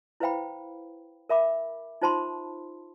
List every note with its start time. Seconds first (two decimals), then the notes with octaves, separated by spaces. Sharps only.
0.20 E4 B4 C5 F5 G5 B5
1.29 A#4 E5 B5 D6
2.02 D#4 F4 C5 A5 B5 C6